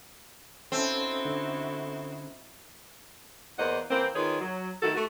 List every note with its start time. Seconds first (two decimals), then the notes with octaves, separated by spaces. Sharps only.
0.72 C4 C#4 D#4 E4 F#4 A4 C5
1.25 D3
3.59 E2 A#3 C5 D#5 F#5
3.91 E3 A#3 C4
4.15 D#3 F4 G#4 B4 C#5
4.41 F#3
4.83 D#3 A3 E4 F#4 A4
4.95 A3 F#4